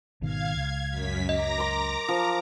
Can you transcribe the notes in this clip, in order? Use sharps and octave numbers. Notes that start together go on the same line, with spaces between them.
G#1 B2 D#3 F5 G#6
C#2 G#6
F#2 B6
D#5 A#5 D6 A#6
A#4 C6
F3